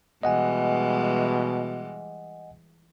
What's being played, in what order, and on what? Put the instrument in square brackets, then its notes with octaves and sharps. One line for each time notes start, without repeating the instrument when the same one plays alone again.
[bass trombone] B2 [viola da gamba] E3 G3 G#3 [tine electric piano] D#5 F#5 G#5